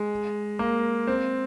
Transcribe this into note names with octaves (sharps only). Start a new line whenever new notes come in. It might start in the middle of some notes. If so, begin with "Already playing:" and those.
Already playing: G#3
A#3
C4